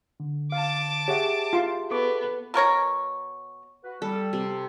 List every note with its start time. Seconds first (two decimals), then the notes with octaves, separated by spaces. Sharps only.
0.20 D3
0.52 F5 A5 D6
1.08 G4 G#4 C#5 E5 F#5
1.53 F4 C6
1.91 B3 A4 C#6 D6
2.54 B2 A#4 C#5 A#5
3.83 F#4 B4
4.02 G3 A4
4.33 C3